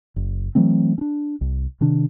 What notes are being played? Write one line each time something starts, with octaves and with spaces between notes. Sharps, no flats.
F#1
E3 F#3 A3 C4
C#4 D4
C2
C3 D#3 D4